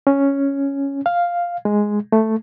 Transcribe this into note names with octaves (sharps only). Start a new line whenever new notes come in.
C#4
F5
G#3
A3